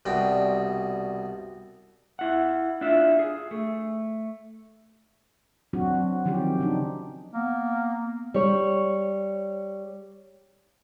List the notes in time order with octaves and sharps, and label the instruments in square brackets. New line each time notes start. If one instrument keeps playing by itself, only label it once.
[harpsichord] C2 B2 D4 G5
[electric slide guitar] E4 F#5
D4 F4 E5
G#4
A3
[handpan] F#3 C4 D4 F#4
F#3
D#3 F3 C4 C#4 G4
C#3 D4 D#4
[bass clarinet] A#3 [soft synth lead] B3
[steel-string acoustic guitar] G3 C#5